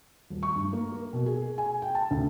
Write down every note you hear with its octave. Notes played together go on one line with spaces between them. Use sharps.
D#1
C#6
G2
A#3
A#4
B2
G#4
G#5
G5
A5
D2